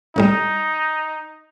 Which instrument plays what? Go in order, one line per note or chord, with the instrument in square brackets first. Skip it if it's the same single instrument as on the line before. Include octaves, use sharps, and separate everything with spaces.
[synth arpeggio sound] C2 A2 G3 [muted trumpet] D#4